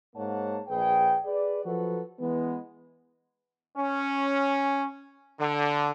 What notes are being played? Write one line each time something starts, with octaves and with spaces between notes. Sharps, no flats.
G#2 A#3 C#5 F#5 A5
A#1 G#4 B4 G5
G#4 B4 D5
F3 F#3 F#4 A4 B4
E3 G#3 B3
C#4
D3